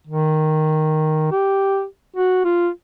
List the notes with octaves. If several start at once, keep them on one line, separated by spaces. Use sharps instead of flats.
D#3
G4
F#4
F4